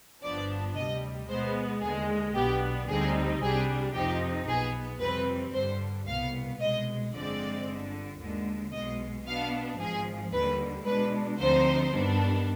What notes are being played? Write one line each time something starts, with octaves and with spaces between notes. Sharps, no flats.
G1 G2 F3 B3 D4 D5
D2 C3 G3 D#5
B2 G#3 B3 C5
D#2 D3 G#3 G#4
B1 B2 B3 D4 G4
D2 D3 G3 C4 D#4 G#4
C2 C3 G3 D4 G#4
F2 C3 F3 C4 D#4 G4
B1 B2 B3 G#4
F2 C3 G3 C4 B4
G2 D3 G3 C5
C2 B2 B3 F5
C2 B2 G#3 D#5
G1 F2 D3 G#3 C4 D5
G1 G2 D3
D#2 D3 G#3
B1 B2 G#3 D#5
B2 B3 D4 F5
G#1 G#2 F3 G#4
D#2 D3 G3 B4
B2 G#3 D4 B4
D2 D3 F3 C4 D#4 C5
G2 D#3 G3 B3 D4